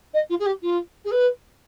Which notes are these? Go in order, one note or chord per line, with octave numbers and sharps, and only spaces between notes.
D#5
F4
G#4
G4
F4
G#4
B4